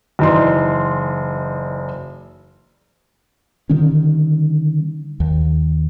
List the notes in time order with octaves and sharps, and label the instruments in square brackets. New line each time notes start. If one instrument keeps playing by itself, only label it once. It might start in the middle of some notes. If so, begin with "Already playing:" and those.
[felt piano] F#1 E3 D#4 D5 C6
[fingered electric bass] D3 D#3 G3 C#4
D#2